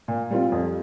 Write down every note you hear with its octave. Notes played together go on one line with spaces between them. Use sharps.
A#2
G3 C4 F4
F2